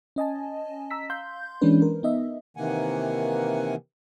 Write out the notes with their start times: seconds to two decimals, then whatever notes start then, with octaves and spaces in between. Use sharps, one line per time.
0.16 C#4 D#5 G#5 A5
0.91 A#5 E6 B6
1.10 F5 C6 G6
1.61 E3 G#3 A#3 C#4 D4 B4
1.82 A#4
2.03 B3 D#4 D#5 E5
2.57 C3 D#3 E3 A#3 F#5 G#5